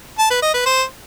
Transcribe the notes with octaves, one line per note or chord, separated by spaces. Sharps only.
A5
B4
D#5
B4
C5